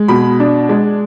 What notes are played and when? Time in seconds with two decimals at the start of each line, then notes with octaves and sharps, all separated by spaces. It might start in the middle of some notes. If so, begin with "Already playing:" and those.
Already playing: G#3
0.08 B2 B5
0.40 D4
0.69 G#3